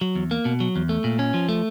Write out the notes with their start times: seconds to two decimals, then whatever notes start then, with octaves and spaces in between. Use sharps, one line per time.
0.01 F#3
0.15 E2
0.31 A#3
0.45 B2
0.60 F#3
0.76 E2
0.89 A3
1.04 A#2
1.19 C#4
1.34 F3
1.49 A3